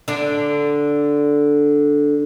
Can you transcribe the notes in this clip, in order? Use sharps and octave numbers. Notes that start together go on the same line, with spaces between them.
D3 D4